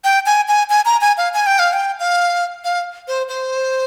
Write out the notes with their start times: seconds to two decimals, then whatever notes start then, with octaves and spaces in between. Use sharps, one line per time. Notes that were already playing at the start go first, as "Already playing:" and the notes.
0.04 G5
0.26 G#5
0.48 G#5
0.70 G#5
0.85 A#5
1.01 G#5
1.18 F5
1.34 G#5
1.46 G5
1.59 F5
1.73 G5
2.00 F5
2.64 F5
3.08 C5
3.29 C5